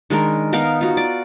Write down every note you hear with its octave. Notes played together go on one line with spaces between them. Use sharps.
D#3 G#3 D4 A#4
B3 D#4 A#4 F5
F4 F#4
D5